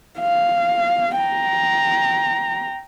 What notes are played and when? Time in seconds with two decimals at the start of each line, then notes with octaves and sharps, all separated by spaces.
0.19 F5
1.18 G5 A#5